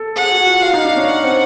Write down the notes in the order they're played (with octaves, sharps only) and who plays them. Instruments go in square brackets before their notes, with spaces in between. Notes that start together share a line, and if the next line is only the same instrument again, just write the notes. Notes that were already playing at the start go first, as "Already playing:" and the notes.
Already playing: [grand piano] A4
[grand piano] G#4 [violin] F#5
[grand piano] F#4
F4
[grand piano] F4 [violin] F5
[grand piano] D#4
D4
C#4
[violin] F#5
[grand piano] C4